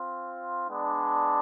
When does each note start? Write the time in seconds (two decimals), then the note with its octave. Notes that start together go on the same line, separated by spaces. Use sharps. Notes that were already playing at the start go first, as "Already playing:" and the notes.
Already playing: C4 F4
0.68 G#3 B3 D4